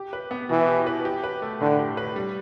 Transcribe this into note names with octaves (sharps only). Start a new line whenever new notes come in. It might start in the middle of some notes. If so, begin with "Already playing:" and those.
Already playing: G4
B4
B3
B2 E3
G4
B4
G4
B4
A3
A2 D3
G4
B4
G3